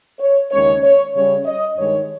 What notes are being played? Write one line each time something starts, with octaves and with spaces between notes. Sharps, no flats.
C#5
D#2 C#3 G#3 C#4 C#5
C#5
C#3 G3 C#4 C#5
D#5
G2 D#3 G#3 C#5